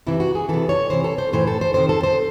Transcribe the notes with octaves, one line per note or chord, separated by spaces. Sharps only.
C3 E3 E4
F#4
G#4
C3 E3 A4
C#5
C3 E3 C5
A4
C5
A2 E3 C5
A4
C5
C3 D#3 C5
A4
C5